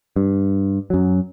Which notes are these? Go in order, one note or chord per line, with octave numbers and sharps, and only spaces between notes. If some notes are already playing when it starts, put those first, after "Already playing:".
G2
F#2 F#3